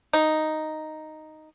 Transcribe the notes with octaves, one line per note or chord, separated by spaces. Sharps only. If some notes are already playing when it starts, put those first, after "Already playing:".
D#4